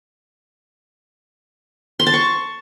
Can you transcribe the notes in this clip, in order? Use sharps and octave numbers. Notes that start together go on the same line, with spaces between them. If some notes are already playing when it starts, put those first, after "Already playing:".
C6
A5
C#6